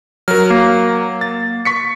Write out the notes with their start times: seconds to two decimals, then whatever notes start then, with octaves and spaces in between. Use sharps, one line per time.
0.28 F#3 A#4 F6
0.51 A#3
1.21 A6
1.65 C#6 B6 C#7